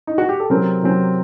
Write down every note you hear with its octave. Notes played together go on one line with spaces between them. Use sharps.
D#4
F#4
G4
A4
C3 F#3 C4 A#4
C3 F#3 C4